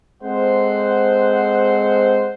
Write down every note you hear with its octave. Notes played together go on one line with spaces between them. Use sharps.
G#3 C4 A4 C5 F#5